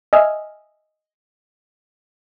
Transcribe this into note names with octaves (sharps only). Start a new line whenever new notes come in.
D#5 E5 G#5 F6